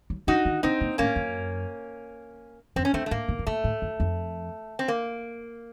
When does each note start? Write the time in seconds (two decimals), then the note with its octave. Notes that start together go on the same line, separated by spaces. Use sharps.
0.10 F#3
0.27 F3 D#4 F#4
0.45 D#3
0.63 C3 C4 D#4
0.81 A#2
0.98 A2 A#3 C#4
1.16 F#2
2.76 F2 C4
2.85 C#4
2.93 F#2 A3 C4
3.06 A3
3.11 A2 A#3
3.28 A#2
3.39 A2
3.47 A#2 A3
3.64 A2
3.82 F#2
4.00 F2
4.79 C4
4.88 A#3